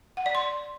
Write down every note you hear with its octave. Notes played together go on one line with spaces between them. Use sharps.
F#5
D5
C6